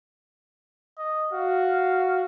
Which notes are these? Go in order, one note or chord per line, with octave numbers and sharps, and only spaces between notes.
D#5
F#4 F5